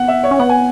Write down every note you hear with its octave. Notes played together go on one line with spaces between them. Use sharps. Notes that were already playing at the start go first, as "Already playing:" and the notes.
Already playing: B3 F#5
E5
C#5
C#4
B3 F#5
G#5